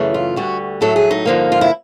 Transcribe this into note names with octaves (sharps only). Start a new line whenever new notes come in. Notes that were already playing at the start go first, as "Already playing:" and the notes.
Already playing: F#2 C#3 E3 A3
F4
D2 D3 G3 F#4
A2 F#3 A3 A4
G#4
D#4
G2 D3 F3 A#3
F4
E4